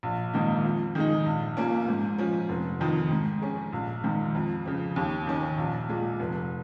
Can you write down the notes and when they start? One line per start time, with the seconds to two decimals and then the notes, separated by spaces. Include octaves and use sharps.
0.03 A#1
0.34 G#2 D#3 A#3 D#4
0.64 F2
0.95 D#3 G#3 D#4
1.26 A#1
1.57 A#2 A#3 C#4
1.88 G#2
2.18 F3 C#4
2.49 F1
2.80 F2 D#3
3.11 G#2
3.41 G#3 C#4
3.73 A#1
4.04 G#2 D#3
4.35 F2
4.66 C#3 F3
4.96 D#2
5.27 D#3 C#4
5.58 A#1
5.88 A#2 G#3
6.20 F1